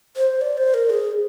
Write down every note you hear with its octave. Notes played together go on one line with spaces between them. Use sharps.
C5
D5
C5
A#4
G#4